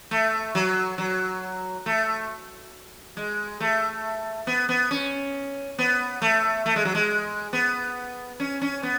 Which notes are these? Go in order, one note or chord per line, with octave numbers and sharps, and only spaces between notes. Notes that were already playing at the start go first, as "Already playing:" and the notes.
A3
F#3
F#3
A3
G#3
A3
B3
B3
C#4
B3
A3
A3
G#3
F#3
G#3
B3
C#4
C#4
B3